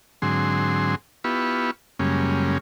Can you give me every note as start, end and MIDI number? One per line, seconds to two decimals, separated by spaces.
0.22 0.95 44
0.22 0.95 50
0.22 0.95 54
0.22 0.95 60
0.22 0.95 68
0.22 0.95 84
1.24 1.71 59
1.24 1.71 64
1.24 1.71 65
1.24 1.71 67
1.24 1.71 71
1.24 1.71 85
1.99 2.58 42
1.99 2.58 49
1.99 2.58 55
1.99 2.58 56
1.99 2.58 58
1.99 2.58 61